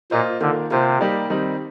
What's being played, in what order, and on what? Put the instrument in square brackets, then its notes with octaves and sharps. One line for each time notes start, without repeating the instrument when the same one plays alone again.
[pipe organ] A#2 [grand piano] A#3 F4 C5 D#5
[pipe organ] D3 [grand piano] D#3 A#3 F4
[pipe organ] C3 [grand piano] A#3 F4 C5
[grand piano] G3 A#3 D#4 G4 D5
D#3 G3 C4 D#4